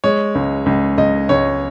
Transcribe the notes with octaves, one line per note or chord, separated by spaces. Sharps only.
G#3 C#5
C#2
C#2
C#2 D#5
C#2 C#5